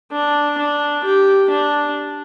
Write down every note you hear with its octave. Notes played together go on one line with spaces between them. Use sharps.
D4
D4
G4
D4